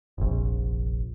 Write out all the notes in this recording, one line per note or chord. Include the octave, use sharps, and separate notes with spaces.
F1 A#1